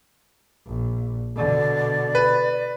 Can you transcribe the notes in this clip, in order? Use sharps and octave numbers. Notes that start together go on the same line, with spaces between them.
A#1
B2 D3 D5
B4